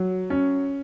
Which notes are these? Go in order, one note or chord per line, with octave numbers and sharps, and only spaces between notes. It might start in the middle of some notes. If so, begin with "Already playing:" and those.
Already playing: F#3
C#4